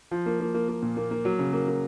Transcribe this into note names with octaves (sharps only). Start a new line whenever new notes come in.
F3
A#3
A#3
A#3
A#3
A#2
A#3
A#3
F#3
C#3
A#3
A#3